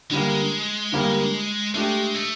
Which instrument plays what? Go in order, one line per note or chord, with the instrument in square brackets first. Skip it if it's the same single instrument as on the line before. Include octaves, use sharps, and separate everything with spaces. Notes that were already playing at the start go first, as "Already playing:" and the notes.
[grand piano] D3 G3 A#3 [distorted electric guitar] G#3
[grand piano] D3 G3 A#3
[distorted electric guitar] G#3 [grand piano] A3 D4 G4
[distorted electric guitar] A3